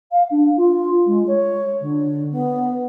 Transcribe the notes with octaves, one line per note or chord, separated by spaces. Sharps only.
F5
D4
F4
G#3
C#5
D3
B3